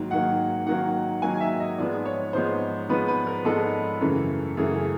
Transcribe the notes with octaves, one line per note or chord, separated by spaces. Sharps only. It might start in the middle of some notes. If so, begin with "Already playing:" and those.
Already playing: G#2 D#3 F#3 A#3
G#2 D#3 F#3 A#3 F#5
G#2 D#3 F#3 A#3 F#5
G#2 D#3 F#3 A#3 G#5
E5
D#5
G#2 F3 G#3 B3 D5
C#5
G#2 F3 G#3 B3 C5
G#2 F3 G#3 B3 B4
B4
A#4
G#2 F3 G#3 B3 A4
F#2 C#3 E3 A3
F#2 C#3 E3 A3 G#4
G#4